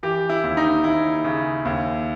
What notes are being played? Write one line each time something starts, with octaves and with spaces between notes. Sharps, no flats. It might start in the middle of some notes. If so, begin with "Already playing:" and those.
E3 G4
E4
D#2
D#4
D#2 E4
C#3
D#2